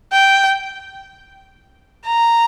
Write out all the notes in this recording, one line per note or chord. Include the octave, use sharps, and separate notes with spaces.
G5
A#5